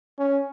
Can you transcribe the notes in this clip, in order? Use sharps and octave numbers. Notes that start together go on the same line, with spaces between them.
C#4